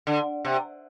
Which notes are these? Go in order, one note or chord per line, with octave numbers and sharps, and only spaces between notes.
D3
C3